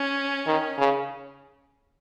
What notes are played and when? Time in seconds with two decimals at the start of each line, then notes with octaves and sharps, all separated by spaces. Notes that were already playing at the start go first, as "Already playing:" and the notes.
Already playing: C#4
0.47 D#3
0.79 C#3